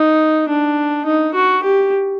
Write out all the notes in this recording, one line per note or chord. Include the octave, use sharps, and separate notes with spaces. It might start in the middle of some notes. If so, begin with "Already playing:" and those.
Already playing: D#4
D4
D#4
F#4
G4